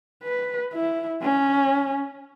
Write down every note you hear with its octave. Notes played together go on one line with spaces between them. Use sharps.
B4
E4
C#4